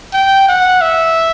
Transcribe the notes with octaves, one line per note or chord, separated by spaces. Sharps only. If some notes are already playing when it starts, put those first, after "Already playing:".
G5
F#5
E5